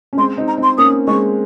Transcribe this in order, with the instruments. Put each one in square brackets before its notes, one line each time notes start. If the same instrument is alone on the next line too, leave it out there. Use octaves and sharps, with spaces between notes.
[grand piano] C#4
[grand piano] G#3 C4 [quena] C6
[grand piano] C4 D#4
[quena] A#5
[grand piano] C4 D#4
[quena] C6
[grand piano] A#3 C#4 [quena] D#6
[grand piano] G#3 C4 [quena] C#6